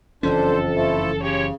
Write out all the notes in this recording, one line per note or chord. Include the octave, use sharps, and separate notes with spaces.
F#1 F2 E3 C#4 D4 A4 C5
F3 A3 E4
C#3 F3 G4 C#5